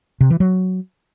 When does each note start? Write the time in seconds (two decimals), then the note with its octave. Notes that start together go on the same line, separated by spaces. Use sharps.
0.21 C3
0.30 E3
0.40 F#3